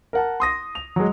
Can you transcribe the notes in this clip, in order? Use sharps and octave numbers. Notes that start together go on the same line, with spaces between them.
A#4 F#5 A5
C6 D#6 A#6
F7
F#3 G#3